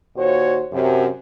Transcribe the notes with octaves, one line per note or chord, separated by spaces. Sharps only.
D#2 A#2 F#4 C5 C#5
F#2 C3